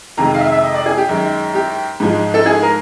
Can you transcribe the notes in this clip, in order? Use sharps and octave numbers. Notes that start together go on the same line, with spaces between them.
F2 C3 D#3 G#3 A#5
F5
E5
E5
D#5
D5
G#4
G4
F#2 D#3 G#3
G4
G#2 F3 G#3
A4
G#4
A#4